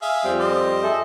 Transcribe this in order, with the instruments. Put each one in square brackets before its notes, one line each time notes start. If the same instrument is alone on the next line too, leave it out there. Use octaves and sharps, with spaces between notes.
[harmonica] G#4 E5 F5
[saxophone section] F2 G3 C4
[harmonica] C5 D#5
[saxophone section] G#4 A4 E5